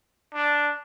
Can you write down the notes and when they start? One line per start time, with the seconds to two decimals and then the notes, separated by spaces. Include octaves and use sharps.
0.34 D4